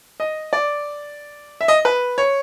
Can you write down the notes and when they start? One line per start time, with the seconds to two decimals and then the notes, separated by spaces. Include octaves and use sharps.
0.20 D#5
0.53 D5
1.61 E5
1.68 D#5
1.85 B4
2.18 C#5